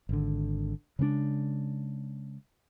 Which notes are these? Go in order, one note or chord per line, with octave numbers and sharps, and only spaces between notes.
G#1 D3
C#3 G#3 A3 D4